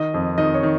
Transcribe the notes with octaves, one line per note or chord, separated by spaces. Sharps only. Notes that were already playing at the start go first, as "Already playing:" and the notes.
Already playing: D#3 D#5
F2
D#3 D#5
C#5
D#3